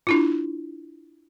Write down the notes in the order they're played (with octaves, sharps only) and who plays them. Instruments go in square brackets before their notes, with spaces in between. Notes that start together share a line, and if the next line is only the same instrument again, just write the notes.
[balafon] D4 E4 F4